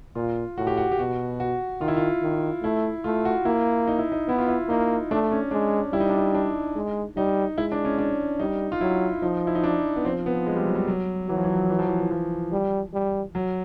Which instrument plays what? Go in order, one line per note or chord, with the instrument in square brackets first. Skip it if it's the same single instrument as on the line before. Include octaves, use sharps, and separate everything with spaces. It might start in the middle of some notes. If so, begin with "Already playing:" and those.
[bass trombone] A#2 [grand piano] F4
[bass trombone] A2 [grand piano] F#4
[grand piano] G4
F#4
G4
[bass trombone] B2 [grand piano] F#4
[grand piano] F#4
[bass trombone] D#3 [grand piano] F4
[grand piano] E4
F4
[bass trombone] D#3
[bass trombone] A3 [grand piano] E4
[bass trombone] A3 [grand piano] F4
[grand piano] F#4
[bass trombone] A#3 [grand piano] E4
[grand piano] D#4
E4
D#4
[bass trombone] B3 [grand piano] E4
[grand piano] F4
E4
[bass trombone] A#3 [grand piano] D#4
[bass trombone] A3 [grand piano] D4
[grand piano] C#4
[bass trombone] G#3 [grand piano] D4
[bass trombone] G3 [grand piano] E4
[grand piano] D#4
D4
D#4
D4
[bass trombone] G#3
[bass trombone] G3 [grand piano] D#4
[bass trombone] G#3 [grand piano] E4
[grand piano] D4
C#4
D4
[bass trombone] G3 [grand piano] D#4
[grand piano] F4
[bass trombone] F#3 [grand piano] E4
[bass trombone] F3 [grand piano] D#4
[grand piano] E4
D#4
D4
B3
[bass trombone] F3 [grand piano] C4
[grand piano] B3
G#3
G3
F#3
G3
F#3
[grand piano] E3 [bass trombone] F#3
[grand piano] F3
E3
E3
F3
E3
E3
F3
[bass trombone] G3
G3
[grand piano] F#3